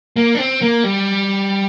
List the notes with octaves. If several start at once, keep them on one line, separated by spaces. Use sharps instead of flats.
A#3
D4
C4
A#3
G3